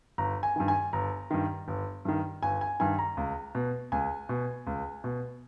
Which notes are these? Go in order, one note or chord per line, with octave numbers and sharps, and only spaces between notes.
G1 A#5
G#5
G2 D#3
G#5
G1 A#5
G2 D#3
G1
G2 D#3
G1 G#5
G#5
G2 D#3 G#5
A#5
C#2
B2
C#2 G#5
B2
C#2
B2